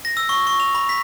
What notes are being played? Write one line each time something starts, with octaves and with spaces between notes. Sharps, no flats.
A#6
E6
C#6
C#6
F7
B5
B6